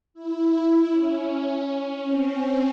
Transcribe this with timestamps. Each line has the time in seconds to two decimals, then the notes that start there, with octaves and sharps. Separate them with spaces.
0.14 E4
0.91 C#4
1.68 C#4
2.06 C4